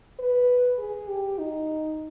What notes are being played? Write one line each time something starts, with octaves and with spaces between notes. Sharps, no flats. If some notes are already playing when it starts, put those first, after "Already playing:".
B4
G#4
G4
D#4